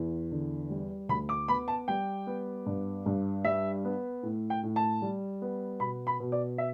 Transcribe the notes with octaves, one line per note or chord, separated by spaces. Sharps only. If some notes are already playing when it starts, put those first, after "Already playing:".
Already playing: E2
D3
G3
D2 B5
D6
B3 B5
A5
G3 G5
B3
G2
G2
G3 E5
B3
A2
G5
A2
A5
G3
B3
B2 B5
B5
B2
D5
E5